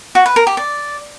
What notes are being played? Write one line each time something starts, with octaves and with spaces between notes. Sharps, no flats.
F#4
B4
A#4
G4
D5